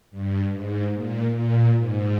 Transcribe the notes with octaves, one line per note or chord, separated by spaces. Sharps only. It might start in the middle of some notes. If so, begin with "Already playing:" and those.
G2
G#2
A#2
A#2
G#2